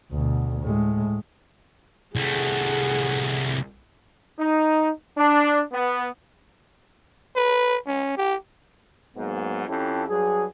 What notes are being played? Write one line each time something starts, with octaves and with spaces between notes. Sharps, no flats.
D2 B2
A2 G#3
C2 A3 G#4 F#5
D#4
D4
B3
B4
C#4
G4
G#2 F#3 A#3 B3
F2 C#4 E4 G4 A4
G2 F#3 G#4